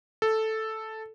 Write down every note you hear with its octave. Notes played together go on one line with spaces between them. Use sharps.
A4